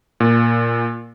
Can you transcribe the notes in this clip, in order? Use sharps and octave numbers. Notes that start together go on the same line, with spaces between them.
A#2